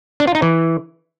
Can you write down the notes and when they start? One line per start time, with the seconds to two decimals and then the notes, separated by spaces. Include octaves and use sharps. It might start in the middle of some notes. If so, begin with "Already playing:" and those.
0.20 D4
0.27 F4
0.35 D#4
0.42 E3